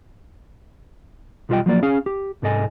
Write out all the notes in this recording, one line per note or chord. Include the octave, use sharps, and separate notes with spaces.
B1 G3 F4 B4 D#5 G5
F3 F#3 A#3 D5
C#4 G#4 F5
G4
C2 G#2 A4 D#5 G#5